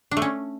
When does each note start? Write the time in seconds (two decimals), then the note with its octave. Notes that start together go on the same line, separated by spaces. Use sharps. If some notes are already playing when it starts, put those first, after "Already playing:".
0.11 D4
0.17 A3
0.22 C#4